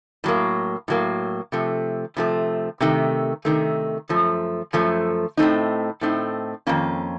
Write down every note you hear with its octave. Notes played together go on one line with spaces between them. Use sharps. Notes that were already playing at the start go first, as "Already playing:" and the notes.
A2 F#3 A#3
A2 F#3 A#3
C3 F3 A3
C3 F3 A3
C3 D#3 A3
C3 D#3 A3
F#2 F3 A3
F#2 F3 A3
A2 A3 C4 D#4
A2 A3 C4 D#4
F2 D#3 A#3 C#4 F4